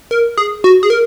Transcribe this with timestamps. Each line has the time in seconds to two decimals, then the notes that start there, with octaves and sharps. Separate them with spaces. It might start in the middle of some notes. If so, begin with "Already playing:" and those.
0.11 A#4
0.38 G#4
0.64 F#4
0.83 G#4
0.90 A#4